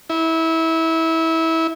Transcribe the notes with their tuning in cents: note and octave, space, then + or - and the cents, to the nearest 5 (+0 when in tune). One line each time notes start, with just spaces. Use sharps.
E4 -20